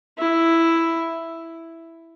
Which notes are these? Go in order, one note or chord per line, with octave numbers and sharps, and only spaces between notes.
E4